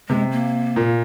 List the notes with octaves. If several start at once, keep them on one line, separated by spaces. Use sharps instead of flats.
C3 G#3
A#3
A#2